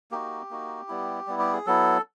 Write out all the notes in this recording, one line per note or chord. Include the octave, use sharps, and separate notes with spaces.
A#3 D#4 F#4 G4
A#3 D#4 F#4
G3 B3 E4
G3 B3 E4
G4
G#4
F#3 B3 E4 A4